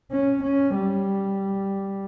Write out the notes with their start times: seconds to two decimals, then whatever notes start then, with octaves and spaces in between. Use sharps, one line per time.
0.12 C#4
0.43 C#4
0.74 G3